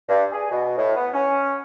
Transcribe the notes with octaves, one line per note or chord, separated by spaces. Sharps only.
G2
G#4
B2
A2
B3
C#4